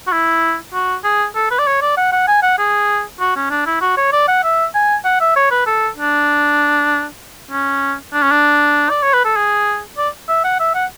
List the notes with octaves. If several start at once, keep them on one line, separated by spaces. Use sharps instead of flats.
F#4
E4
F#4
G#4
A4
B4
D5
C#5
D5
F#5
F#5
G#5
F#5
G#4
F#4
C#4
D4
E4
F#4
C#5
D5
F#5
E5
G#5
F#5
E5
C#5
B4
A4
D4
C#4
D4
C#4
D4
D5
C#5
B4
A4
G#4
D5
E5
F#5
E5
F#5